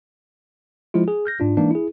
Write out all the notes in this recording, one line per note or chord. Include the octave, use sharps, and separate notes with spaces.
F3 G#3 E4 F4
G#4
F6 G6 A#6
G#2 D4 F4
E3 G#3 A#3 D4 D#4
E4 G#4